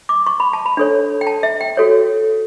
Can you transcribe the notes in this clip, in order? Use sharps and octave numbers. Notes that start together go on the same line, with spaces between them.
D6
C#6
B5
A5
B5
D4 A4 C#5
G5
A5
E5
G5
F#4 A4 C#5